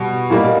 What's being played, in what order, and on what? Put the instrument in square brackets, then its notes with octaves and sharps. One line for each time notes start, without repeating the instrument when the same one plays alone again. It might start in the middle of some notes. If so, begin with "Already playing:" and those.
Already playing: [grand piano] B2 G3
A#2 G3 A#3 D#4